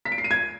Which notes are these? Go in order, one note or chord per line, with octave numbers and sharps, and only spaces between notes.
B6
D7
C7
D#7
G#6